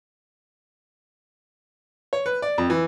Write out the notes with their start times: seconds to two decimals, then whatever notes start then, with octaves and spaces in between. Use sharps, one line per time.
2.13 C#5
2.26 B4
2.42 D5
2.58 F2
2.70 E3